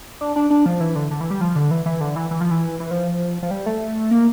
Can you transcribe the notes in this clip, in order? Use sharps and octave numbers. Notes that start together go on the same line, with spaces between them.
D4
D4
D4
F3
E3
D3
D3
E3
G3
F3
D3
E3
E3
D3
E3
E3
F3
E3
E3
F3
F3
G3
A3
A#3